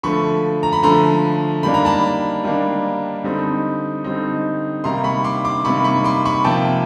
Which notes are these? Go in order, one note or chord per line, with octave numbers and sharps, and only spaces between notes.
D3 F3 A3 B5 C#6
A#5
B5
D3 F3 A3 A#5 C6
D#3 G3 A#3 D4 B5
A#5
A5 B5
D#3 G3 A#3 D4
D3 G3 C4 D#4
D3 G3 C4 D#4
C3 D#3 G3 A#3 A#5 C6
B5 C#6
C6 D6
C6 D6
C3 D#3 G3 A#3 B5 C#6
B5 C#6
C6 D6
B5 C#6
C3 F3 A#3 G5 A5